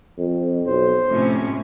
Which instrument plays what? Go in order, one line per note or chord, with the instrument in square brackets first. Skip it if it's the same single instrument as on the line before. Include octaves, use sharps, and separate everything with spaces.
[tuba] F2
[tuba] B1 [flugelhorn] C5
[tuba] F2 [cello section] A2 C3 C#4